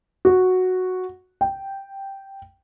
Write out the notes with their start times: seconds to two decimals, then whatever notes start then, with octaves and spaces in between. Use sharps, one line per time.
0.25 F#4
1.41 G5